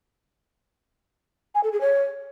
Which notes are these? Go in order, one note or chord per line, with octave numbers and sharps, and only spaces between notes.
G#5
A4
G#4
C#5